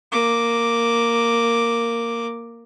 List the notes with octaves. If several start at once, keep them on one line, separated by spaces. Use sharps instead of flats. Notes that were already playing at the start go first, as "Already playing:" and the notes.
A#3 D6